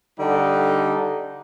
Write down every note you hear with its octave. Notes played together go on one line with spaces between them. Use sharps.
D3 G3 D#4